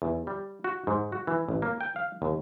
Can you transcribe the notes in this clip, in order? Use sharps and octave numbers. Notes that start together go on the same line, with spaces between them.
E2
G3
F#4
G#2
F#4
E3
A1
A#3
G5
F5
D#2